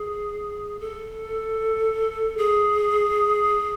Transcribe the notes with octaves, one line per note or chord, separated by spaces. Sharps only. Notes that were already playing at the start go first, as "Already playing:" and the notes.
Already playing: G#4
A4
G#4